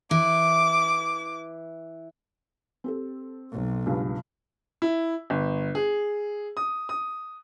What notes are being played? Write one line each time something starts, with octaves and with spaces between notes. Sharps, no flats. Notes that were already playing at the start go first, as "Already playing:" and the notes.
E3 D6
C4 G4 A4
B1
C#2 G2
E4
G1
G#4
D#6
D#6